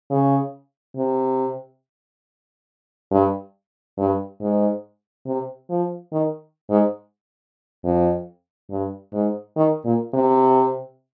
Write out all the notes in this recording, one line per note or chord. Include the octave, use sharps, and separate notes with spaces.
C#3
C3
G2
G2
G#2
C3
F3
D#3
G#2
F2
G2
G#2
D#3
A#2
C3